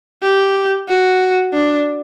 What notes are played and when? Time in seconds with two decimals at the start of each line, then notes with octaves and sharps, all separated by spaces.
0.22 G4
0.88 F#4
1.53 D4